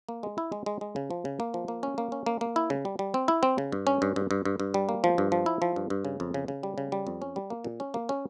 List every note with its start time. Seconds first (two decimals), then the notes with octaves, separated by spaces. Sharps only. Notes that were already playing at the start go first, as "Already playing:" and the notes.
0.09 A#3
0.23 G#3
0.38 E4
0.52 G#3
0.66 G#3
0.81 G#3
0.96 C#3
1.10 F3
1.25 C#3
1.40 A#3
1.54 F3
1.68 A#3
1.83 C#4
1.98 A#3
2.12 C#4
2.26 A#3
2.41 A#3
2.56 E4
2.70 C#3
2.85 G3
2.99 G3
3.14 C4
3.28 E4
3.43 C4
3.58 C#3
3.72 G2
3.87 C#4
4.02 G2
4.16 G2
4.31 G2
4.45 G2
4.60 G2
4.74 G3
4.89 A#3
5.04 F3
5.18 G2
5.32 F3
5.46 E4
5.62 F3
5.76 G2
5.90 G2
6.05 C#3
6.20 F2
6.34 C#3
6.48 C#3
6.63 G3
6.78 C#3
6.92 G3
7.07 F2
7.22 C#4
7.36 G3
7.50 A#3
7.64 A#2
7.80 C#4
7.94 A#3
8.09 C#4